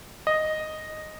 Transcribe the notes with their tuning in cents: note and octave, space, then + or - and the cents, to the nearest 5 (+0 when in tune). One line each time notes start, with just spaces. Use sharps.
D#5 -5